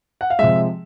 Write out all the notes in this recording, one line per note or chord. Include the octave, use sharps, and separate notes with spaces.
F#5
F5
C3 F3 G#3 E5